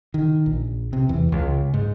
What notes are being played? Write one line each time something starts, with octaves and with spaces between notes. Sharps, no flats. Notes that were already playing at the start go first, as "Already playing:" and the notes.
D#3
A#1
C3
E2
C#2
G#2